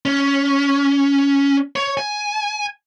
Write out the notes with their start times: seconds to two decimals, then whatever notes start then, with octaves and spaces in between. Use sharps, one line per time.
0.06 C#4
1.76 C#5
1.97 G#5